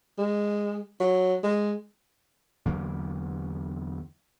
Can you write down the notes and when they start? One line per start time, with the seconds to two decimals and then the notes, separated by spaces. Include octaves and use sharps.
0.18 G#3
1.00 F#3
1.43 G#3
2.66 E2 D3 F#3 A#3